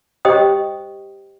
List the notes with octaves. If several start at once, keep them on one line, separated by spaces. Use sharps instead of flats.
G4 C5 D#5 G5 D#6